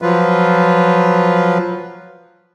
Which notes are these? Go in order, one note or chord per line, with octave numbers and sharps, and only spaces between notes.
F3 F#3 F4 B4